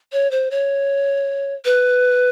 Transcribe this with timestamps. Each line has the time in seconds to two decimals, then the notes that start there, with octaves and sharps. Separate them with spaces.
0.13 C#5
0.31 C5
0.51 C#5
1.65 B4